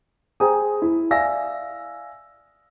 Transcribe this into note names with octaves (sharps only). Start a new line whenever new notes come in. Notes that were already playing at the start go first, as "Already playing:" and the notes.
G#4 C5 G5 G#5 A#5 D#6
E4
D5 E5 F5 G#5 E6 A#6